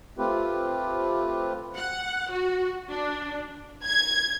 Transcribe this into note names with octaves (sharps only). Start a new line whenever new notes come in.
A3 C4 F4 G4 B4
F#5
F#4
D4
G#6